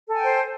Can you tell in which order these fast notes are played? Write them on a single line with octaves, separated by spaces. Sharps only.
A4 G#5 G5 C5